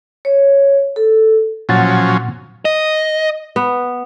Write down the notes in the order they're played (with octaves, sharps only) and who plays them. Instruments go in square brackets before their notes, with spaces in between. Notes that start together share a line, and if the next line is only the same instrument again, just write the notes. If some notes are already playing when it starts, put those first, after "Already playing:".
[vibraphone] C#5
A4
[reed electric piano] A#2 F#5 A6 [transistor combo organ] F3 F#3 C#4
[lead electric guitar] D#5
[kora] B3